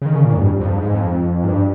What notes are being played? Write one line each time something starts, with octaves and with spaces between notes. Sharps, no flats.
C#3
D#3
C#3
A#2
G#2
F2
G2
F2
G2
G#2
F2
G#2
G2